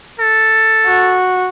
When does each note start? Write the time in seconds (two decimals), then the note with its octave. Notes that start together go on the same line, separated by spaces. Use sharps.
0.20 A4
0.86 F#4